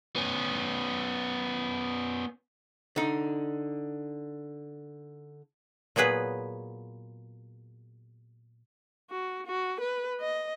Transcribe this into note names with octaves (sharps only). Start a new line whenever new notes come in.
B3 C#4
D3 D#4
A#2 F#3 B3 G#4 B4
F#4
F#4
B4
D#5